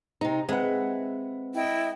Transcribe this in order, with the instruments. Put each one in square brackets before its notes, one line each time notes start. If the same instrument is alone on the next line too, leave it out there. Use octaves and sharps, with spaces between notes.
[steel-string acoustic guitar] C3 D#4 [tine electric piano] A#5
[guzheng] G#3 [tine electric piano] C4 B4 [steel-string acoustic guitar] E5 F#5
[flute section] E4 D#5 G5